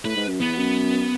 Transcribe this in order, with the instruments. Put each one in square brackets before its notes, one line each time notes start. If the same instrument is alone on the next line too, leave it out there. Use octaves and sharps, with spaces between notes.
[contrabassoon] A2 [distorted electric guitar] B4
[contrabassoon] G#2
F#2
[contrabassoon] E2 [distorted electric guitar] B3
[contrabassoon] F#2